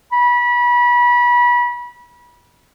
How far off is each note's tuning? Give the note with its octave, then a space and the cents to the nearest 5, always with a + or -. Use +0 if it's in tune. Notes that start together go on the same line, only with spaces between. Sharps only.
B5 -30